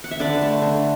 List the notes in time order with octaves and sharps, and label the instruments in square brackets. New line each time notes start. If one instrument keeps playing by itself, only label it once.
[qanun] F#5
E5
D3 B4 D5
A3
D3